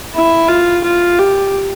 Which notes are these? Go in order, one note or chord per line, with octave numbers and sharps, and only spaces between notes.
E4
F4
F4
G4